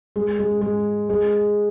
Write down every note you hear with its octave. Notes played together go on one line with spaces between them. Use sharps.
G#3
G#3
G#3
G#3